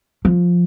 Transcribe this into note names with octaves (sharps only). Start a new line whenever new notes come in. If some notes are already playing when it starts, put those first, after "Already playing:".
F3